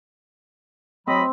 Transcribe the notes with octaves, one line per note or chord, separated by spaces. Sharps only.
F#3 C4 D#5 B5